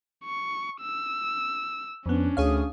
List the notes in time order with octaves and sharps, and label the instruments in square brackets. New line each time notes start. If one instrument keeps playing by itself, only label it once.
[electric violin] C#6
E6
[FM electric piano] F2 B3 [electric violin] C#4 D4
[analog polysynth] D2 D#6 [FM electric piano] G#4 C#5 F5